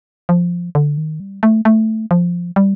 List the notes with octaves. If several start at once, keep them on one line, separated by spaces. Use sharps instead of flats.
F3
D3
D#3
G3
A3
A3
F3
G3